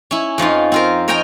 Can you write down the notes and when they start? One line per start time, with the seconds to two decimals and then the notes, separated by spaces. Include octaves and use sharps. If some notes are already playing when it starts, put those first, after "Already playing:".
0.11 C#4 E4
0.38 F2 F3 D#4 F4
0.72 C4 F4 A#4
1.08 A#4 C#5 D#5 G5 G#5 A#5